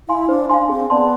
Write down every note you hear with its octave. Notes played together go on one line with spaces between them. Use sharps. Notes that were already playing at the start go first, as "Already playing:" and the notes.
E4 F5 G#5 C6
D4 C5
D4 F5 G#5 C6
C4 G#4
B3 D5 A5 C6